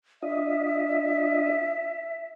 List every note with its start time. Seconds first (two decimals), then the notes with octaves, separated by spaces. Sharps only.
0.23 D4 F4 D#5 E5